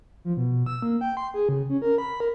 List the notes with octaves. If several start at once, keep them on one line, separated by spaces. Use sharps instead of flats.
F3
B2
E6
A#3
G5
C6
G#4
C#3
C#4
A#4
B5
A#4